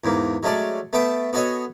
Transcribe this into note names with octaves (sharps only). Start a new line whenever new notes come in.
E2 G#2 A#3
F#3 G#3 A3 C#4 A4 D5
A3 B3 E5 G5 A5
B3 F#4 A4 C#5 D#5 G#5